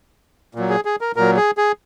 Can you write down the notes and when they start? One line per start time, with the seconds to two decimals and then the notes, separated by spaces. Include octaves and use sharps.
0.55 A#2 F#3
0.70 G#4
0.85 G#4
1.01 A#4
1.16 A#2 F#3 A#4
1.37 G#4
1.58 G#4